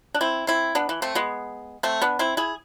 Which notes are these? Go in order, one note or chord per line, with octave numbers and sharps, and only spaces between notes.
D4
C4 E4
C4 E4
B3 D4
E3
A3 C4
G#3 B3
A3 C4
B3 D4
C4 E4
E4 G#4